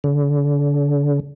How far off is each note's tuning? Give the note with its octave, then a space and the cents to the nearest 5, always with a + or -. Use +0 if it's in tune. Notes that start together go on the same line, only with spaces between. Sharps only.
D3 -35